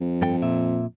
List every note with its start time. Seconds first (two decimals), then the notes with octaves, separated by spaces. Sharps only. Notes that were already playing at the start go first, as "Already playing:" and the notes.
0.01 F2
0.22 G2 A4 G5
0.42 A#2 E5